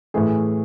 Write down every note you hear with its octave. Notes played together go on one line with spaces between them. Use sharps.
A2 E3 A3 G#4